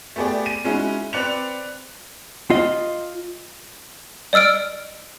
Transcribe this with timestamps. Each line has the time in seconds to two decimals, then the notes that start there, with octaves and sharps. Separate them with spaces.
0.16 A3 B3 G4 G#4 D5
0.46 D#7
0.64 G#3 C#4 D#4 E4 F#4
1.13 C4 B4 D5 F#6 C#7 F7
2.50 F4 D#5
4.33 D5 D#5 E6 F6 D7